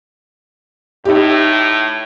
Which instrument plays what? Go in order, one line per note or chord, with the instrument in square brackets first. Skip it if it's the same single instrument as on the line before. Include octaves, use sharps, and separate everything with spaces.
[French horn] A2 [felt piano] D#4 G4